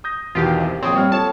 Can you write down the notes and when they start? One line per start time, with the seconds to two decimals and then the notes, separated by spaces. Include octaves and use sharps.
0.04 D#6 G6 A#6
0.35 E2 B2 D#3 F4 G4 F5
0.60 C3
0.83 A#1 C4 C#5 D#6
0.94 G3 C#5 F6
1.12 F4 A4 C#5 A5